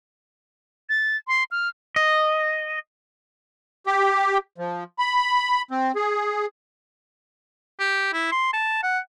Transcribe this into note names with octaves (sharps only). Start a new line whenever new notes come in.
A6
C6
F6
D#5
G4
F3
B5
C4
G#4
G4
E4
C6
A5
F#5